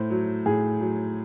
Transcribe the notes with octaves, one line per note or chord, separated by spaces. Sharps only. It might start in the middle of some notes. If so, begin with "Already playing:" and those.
Already playing: A2 C5
F#3
A2 G#4
F#3